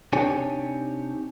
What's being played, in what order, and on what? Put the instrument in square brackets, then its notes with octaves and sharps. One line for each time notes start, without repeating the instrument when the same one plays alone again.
[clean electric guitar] C3 D4 D#4 G4 C#5 G#5